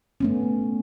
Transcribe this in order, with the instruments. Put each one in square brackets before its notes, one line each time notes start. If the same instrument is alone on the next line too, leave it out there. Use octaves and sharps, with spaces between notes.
[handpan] A3 B3 C#4